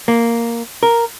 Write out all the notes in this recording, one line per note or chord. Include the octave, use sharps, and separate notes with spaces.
A#3
A#4